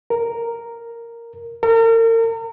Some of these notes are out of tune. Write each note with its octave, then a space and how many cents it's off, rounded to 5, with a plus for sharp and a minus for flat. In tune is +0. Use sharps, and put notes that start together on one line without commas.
A#4 -5
A#4 -40